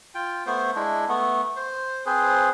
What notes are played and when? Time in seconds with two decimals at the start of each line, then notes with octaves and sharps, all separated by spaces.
0.15 F4 G5
0.46 A3 B3 C5
0.76 G#3 D4 E4
1.08 A3 B3
1.56 C5
2.06 C4 G#4 B4 C5